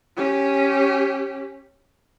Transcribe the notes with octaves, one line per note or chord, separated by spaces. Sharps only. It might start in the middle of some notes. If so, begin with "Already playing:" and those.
C#4 G4